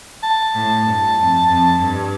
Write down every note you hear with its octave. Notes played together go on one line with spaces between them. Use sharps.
A5
A2
G2
F2
F2
G2